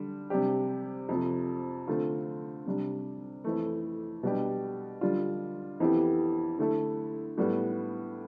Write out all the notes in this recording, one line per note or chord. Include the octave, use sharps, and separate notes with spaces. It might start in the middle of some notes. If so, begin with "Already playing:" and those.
Already playing: D3 G3 D4
C3 G3 D4 G4
F2 C3 F3
D3 A3 C4 F4
C3 G3 D4
F2 E3 A3
B2 G3 D4 G4
D3 G3 D4 F4
F2 E3 B3 E4 G4
D3 A3 E4 A4
A2 G3 B3